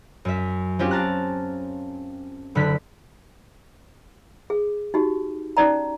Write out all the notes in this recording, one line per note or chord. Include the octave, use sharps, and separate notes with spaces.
F#2 E5
C4 C#4 F4 G4
F5 A5 A#5 F#6
F#1 D3 B5 F#6 B6
G#4
D#4 F#4 G4
C#4 D#4 D5 A#5